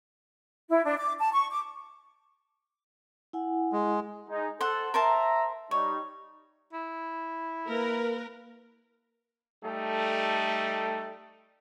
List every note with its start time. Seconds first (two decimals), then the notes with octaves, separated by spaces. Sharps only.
0.70 E4
0.84 D4
0.99 D6
1.19 A5
1.32 C#6
1.51 D6
3.33 E4 F#5 G#5
3.73 G#3
4.29 G#3 D#4
4.61 A4 C5 F#5
4.94 A#4 C5 E5 A5 A#5
5.71 G3 D#4 C#5
6.73 E4
7.69 A#3 A#4 B4
9.63 G3 A3 D#4 A4